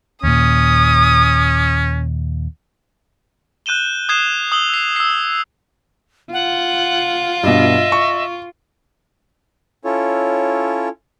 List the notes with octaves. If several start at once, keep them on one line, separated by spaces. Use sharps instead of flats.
D#2 A#2 C#4 D#6
F#6 G6 D#7 E7 G7
D#6 G#6 C7 E7
D#6 E6 F#7 G7
E6 C7
E6 C7
F4 F#5
G2 B2 D#5 E5
C#6
C#4 E4 F4 A4 C#5